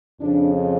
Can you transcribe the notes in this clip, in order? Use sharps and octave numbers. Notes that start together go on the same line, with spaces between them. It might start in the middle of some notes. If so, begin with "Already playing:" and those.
F2 C#3 F3 D4